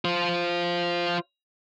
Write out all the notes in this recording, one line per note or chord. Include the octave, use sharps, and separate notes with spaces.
F4 C5